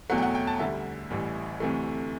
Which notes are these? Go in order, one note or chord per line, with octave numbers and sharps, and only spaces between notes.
E2 B2 F#3 A3 F#5
G5
F#5
G5
A5
D2 D3 G3 E5
A1 A2 E3 G3
D2 C3 E3 A3